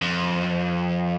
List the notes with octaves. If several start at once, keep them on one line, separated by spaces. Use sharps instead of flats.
F2